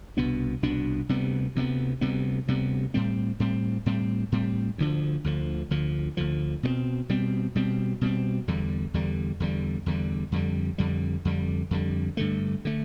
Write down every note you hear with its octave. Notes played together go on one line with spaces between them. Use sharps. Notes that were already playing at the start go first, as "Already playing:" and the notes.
C2 B2 B3 D4
C2 B2 B3 D4
D2 C3 G3 B3
D2 C3 G3 B3
D2 C3 G3 B3
D2 C3 G3 B3
A2 G3 C4
A2 G3 C4
A2 G3 C4
A2 G3 C4
D2 D3 F3
D2 D3 F3
D2 D3 F3
D2 D3 F3
B2 G3 C4
B2 G3 C4
B2 G3 C4
B2 G3 C4
E2 D3 G3
E2 D3 G3
E2 D3 G3
E2 D3 G3
F2 D3 G3
F2 D3 G3
F2 D3 G3
F2 D3 G3
G2 D3 A3
D3 A3